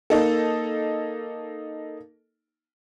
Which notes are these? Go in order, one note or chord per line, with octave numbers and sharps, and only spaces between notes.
A#3 D#4 A4